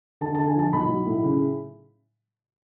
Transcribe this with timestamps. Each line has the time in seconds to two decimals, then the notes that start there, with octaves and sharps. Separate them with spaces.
0.21 D3 A5
0.35 D3 A5
0.47 G#5
0.56 F3 A5
0.73 B1 B5
0.89 F#3
1.06 A2
1.24 C#3